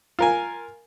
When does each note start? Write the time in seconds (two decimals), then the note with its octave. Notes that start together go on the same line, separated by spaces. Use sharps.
0.19 F4 A#4 G#5